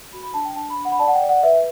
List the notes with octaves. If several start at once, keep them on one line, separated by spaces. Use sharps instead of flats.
F#4 B5
B5
D4 A5
G5
D4 A5
B5
D4
F#5
B5
D5 A5
F#5
G5
D5
F#5
B4 E5